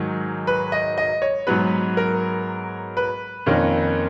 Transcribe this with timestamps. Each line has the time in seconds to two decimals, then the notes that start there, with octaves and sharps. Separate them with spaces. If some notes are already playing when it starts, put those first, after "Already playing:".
Already playing: G#2 D#3 F#3
0.47 B4
0.72 D#5
0.98 D#5
1.22 C#5
1.47 G#2 F#3 B3 B4
1.97 A#4
2.97 B4
3.46 F2 D#3 A#3 C#4